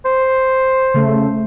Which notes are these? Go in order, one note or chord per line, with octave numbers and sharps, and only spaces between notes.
C5
C#3 A3